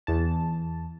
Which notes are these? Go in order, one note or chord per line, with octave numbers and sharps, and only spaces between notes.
E2 A5